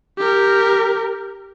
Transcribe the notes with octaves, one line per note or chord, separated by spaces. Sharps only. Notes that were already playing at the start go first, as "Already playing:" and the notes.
G4 A#4